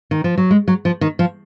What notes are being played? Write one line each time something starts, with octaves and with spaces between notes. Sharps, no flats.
D#3
F3
F#3
G#3
F#3
F3
D#3
F3